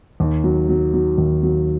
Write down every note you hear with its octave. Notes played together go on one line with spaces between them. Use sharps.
D#2
F#3
F#3
F#3
D#2
F#3